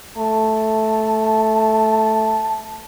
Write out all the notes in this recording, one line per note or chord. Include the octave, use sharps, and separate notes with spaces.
A3 A5